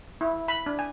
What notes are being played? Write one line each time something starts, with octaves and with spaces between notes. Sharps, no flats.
E4
B5
D4
G#5